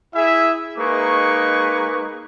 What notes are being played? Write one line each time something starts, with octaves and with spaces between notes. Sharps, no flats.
E4 G#4 E5
G#3 A#3 D#4 G#4 B4 C#6